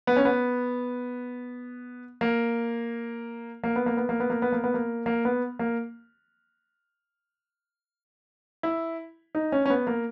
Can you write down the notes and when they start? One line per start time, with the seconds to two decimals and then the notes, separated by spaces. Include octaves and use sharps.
0.07 B3
0.17 C#4
0.25 B3
2.21 A#3
3.64 A#3
3.76 B3
3.86 A#3
3.97 B3
4.09 A#3
4.20 B3
4.30 A#3
4.42 B3
4.52 A#3
4.64 B3
4.74 A#3
5.06 A#3
5.25 B3
5.59 A#3
8.63 E4
9.35 D#4
9.52 C#4
9.66 C#4
9.70 B3
9.87 A#3